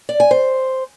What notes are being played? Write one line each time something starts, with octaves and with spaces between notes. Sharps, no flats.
D5
G#5
C5